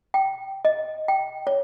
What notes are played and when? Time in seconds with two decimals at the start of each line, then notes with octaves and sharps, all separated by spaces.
0.14 G5
0.65 D#5
1.08 G5
1.47 C#5